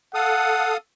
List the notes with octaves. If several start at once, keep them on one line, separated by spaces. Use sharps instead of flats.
A4 F5 F#5 D#6